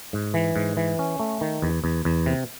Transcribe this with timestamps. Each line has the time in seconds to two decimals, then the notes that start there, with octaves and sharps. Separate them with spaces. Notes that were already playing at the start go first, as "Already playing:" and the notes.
0.13 G#2
0.34 E3
0.56 G#2
0.77 E3
0.99 C#4
1.20 A3
1.41 D#3
1.62 E2
1.84 E2
2.05 E2
2.26 C3